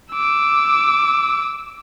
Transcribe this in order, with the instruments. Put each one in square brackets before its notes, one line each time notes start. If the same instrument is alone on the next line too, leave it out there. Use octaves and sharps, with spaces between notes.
[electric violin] D6 E6